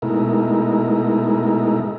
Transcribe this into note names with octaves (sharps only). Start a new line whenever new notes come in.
B2 G#3 A3 D#4 E4 A#4